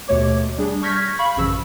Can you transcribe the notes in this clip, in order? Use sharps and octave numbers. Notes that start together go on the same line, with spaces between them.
D#2 B2 A3 C#5 D6
G3 D4 G#4
C#6 F6 G6 G#6 A#6 B6
F5 B5 C#6
A1 F#2 C#3 F3 E6